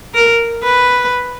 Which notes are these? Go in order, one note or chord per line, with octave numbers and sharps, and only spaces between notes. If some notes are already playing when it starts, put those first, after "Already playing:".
A#4
B4